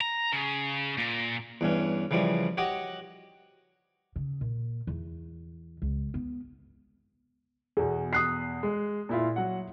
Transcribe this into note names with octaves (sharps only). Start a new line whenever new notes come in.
A#5
C#3
A#2
E2 G2 C#4
C#3 E3 F3 G3
F#4 G4 C#5 D#5 F#5
C#3
A#2
E2
C#2
B3
E2 B2 G#4
D#6 F#6 C7
G#3
A#2 E4 F4
F#3 F#5